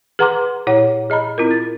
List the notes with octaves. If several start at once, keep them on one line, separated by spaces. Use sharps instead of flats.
G#4 B4 F#5 A#5 C6 D6
A#2 E4 C#5 F#5
G#4 D#5 A#5 B5
C4 E4 F4 A#4
A6